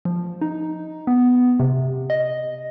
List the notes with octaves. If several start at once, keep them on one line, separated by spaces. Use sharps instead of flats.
F3
D#4
B3
C3
D#5